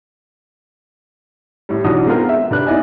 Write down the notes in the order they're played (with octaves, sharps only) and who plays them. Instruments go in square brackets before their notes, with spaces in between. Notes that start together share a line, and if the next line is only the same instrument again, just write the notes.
[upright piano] A2 G3
B1 E3 D4 D#4 F#4 D#6
G#3 B3 C4 D#4 F4 A#4
E5
C3 D4 B4 F#6
B3 D#4 E4 D5 D#5 G#5